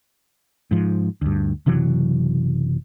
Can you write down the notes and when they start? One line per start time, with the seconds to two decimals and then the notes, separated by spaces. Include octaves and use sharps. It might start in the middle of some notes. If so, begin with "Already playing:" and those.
0.71 G#2 F3
1.21 D2 G2
1.66 F#1 C3 E3 F#3